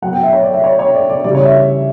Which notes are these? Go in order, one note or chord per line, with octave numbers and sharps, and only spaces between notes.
B2 F#3 F#5
G5
E5
C#5
D5
E5
C#5
C#5
D5
D5
C#3 E3 G3 D5
C#5
E5